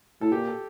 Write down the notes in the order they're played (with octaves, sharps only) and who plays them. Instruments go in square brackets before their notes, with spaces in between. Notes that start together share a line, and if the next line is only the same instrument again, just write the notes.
[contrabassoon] A2 [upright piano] A4
[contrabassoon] A#2 [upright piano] G4
[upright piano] A4